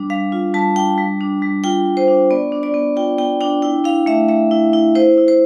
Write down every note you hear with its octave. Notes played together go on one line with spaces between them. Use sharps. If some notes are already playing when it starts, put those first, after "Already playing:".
Already playing: G3 D4
G3 F5
F4
G3 A5
D4 G5
G3
D4
G3
F4 G5
G3
C5
D4
B3 D5
D4
D5
B3
F4 G5
B3 G5
D4 G5
E4 G5
E4 F5
A3 E5
A3 E5
E4
E4
E4 C5
E4
C5